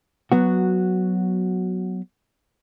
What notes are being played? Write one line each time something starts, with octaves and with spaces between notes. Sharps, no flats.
F#3 B3 F#4